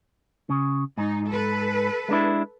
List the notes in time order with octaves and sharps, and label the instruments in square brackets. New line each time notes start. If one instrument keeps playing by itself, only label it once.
[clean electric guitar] C#3
[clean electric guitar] G#2 [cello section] D#4
[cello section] A4 B4
[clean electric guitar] G#3 D4 E4